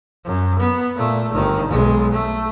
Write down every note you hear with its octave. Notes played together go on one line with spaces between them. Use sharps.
F#2
B3
A#2 A3
G1 D#3
B1 G#3
A3